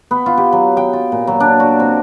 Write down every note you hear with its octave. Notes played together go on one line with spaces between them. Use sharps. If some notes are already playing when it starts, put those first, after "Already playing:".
B3
F4
G4
F#3
G5
F4
A#2
F#3
D4
F#4
C4